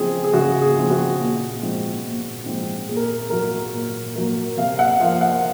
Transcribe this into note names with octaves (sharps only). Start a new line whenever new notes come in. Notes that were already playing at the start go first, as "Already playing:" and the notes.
Already playing: C#3 F3 C4 G#4
G#4
C#3 F#4
G#4
F3 C4
F#4
A#2
F3 G#3 C4
A#2
F3 G#3 C4
A#2 G#4
A#4
G#4
F#3 A#3 A#4
A#2
F#3 A#3
C3 F5
F#5
F3 A#3 F5
F#5